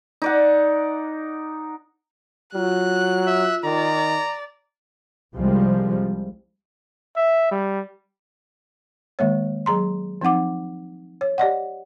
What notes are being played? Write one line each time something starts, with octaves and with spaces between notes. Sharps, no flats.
D#4 D5 F#5
F#3 F4 F#6
E5
D#3 D5 A#5
C2 F3 G3 G#3
E5
G3
D#3 G#3 A#3 C#5
F#3 G#4 A#5 C6
F3 C4 D#4 F#5 D6
C#5
G4 D5 D#5 F#5